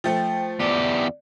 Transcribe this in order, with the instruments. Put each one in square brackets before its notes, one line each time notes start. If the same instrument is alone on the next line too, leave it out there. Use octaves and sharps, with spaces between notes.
[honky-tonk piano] F3 A3 [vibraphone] G5
[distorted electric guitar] E2 G4 [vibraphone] D5